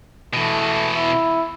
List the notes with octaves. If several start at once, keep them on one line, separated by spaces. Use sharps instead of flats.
B2 E3 A3
E4